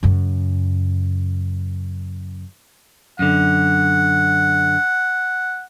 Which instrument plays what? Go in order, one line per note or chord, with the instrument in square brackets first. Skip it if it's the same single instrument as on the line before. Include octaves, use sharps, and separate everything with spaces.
[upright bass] F#2 C#3
[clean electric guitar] F#2 D3 [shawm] F#5